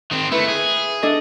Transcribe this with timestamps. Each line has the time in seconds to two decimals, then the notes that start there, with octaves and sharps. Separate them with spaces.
0.11 D#3 C4
0.32 A3 E4 B4
0.48 G#4
1.03 D4 A4 D#5